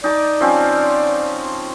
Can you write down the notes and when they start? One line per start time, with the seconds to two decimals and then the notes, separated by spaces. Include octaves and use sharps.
0.04 D#4 D5 A5 D6
0.41 F3 C4 C#4